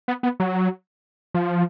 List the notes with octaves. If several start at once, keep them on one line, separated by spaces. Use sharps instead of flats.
B3
B3
F#3
F3